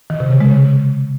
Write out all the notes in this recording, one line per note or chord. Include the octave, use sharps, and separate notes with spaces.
D#3
C3
C#3
G#3
C#3